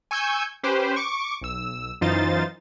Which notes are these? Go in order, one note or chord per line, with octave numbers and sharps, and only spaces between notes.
G#5 C#6 E6 G6 G#6
C#4 G4 B4 C5
C#6 D6
B1 E6
F#2 E3 D#4 F4 C5 A6